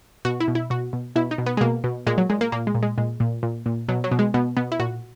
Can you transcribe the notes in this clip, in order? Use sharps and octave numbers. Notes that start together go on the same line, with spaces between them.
B2 F#4
E4
B2
E4
B2 F#4
B2
B2 E4
D#4
B2
B3
G#3
B2 A#3
B2
A#2 G#3
F#3
A#2 G#3
A#3
A#2 A#3
G#3
A#2
G#3
A#2 G#3
A#2
A#2
A#2
B2 F#3
F#3
B2
G#3
B2 B3
B2 B3
E4
A#2 F#4